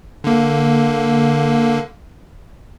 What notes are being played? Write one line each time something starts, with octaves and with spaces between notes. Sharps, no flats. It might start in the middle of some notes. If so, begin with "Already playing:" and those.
D3 A#3